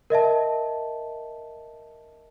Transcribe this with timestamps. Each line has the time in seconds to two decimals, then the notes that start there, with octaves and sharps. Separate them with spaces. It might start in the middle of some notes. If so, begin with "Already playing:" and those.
0.10 A#4 D#5 E5 A5